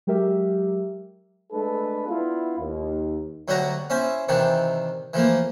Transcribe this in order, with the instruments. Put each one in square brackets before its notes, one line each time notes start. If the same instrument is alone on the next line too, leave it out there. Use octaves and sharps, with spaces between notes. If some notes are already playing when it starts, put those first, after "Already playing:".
[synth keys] F#3 G#3 G4 A#4 E5
[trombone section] G#3 A3 D4 A4 B4
B3 D4 E4 F4
D#2
[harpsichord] D2 F#3 G3 F#4 C#5 A#5
C#4 E4 C5 G#5
C3 D#3 E3 D4
E3 F3 A3 A#3